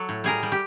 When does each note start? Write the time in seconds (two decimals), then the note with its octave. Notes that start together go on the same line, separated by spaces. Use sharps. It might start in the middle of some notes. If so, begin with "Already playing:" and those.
Already playing: F#3 A4
0.09 A2
0.24 G3 G#4 A#4
0.43 G3
0.52 G4